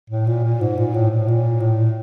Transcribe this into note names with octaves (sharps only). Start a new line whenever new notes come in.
A2
A#2
A#2
G#2
A#2
A2
A2
A#2
A2